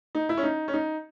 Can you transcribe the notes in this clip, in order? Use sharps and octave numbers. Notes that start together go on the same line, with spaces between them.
D#4
E4
C#4
D#4
C#4
D#4